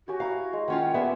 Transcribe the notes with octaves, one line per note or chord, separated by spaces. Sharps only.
F#4 G4 C#5 G#5
E4 F5 A#5
G#3
D#3 C#4 F4 F#5
G3 A#3 B3 E5 G#5 C6